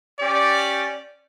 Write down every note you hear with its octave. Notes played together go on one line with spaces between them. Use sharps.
C#4 G4 D5